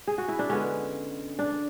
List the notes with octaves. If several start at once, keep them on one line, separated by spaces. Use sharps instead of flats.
G#4
F#4
E4
D4
D3 G#3 B3 C#4
D4